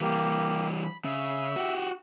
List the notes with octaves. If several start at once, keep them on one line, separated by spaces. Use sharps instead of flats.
E3 G3 A#3 G4
B5
C#3 E5
F#4 G4